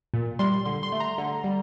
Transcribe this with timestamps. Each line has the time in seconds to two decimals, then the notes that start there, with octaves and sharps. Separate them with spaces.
0.14 A#2
0.39 G3 C6
0.65 D3 C6
0.83 C6
0.92 A3
1.00 A#5
1.18 D3
1.44 G3